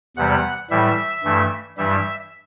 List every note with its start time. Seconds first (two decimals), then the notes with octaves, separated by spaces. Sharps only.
0.17 E2 C3 E3 G3 F#5
0.70 A2 E3 G3 E5
1.24 G2 E3 A3
1.78 G2 E3 G3 E5